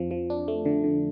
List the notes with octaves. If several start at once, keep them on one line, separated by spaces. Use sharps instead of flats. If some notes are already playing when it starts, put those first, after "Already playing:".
Already playing: F2 F3
F3
D4
A3
D3
D3